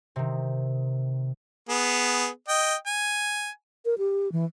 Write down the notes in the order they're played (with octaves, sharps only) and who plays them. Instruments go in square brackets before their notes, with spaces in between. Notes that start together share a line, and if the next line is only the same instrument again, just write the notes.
[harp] C3 D#3
[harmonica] B3 G#4
D#5 G5
G#5
[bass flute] A#4
G4
E3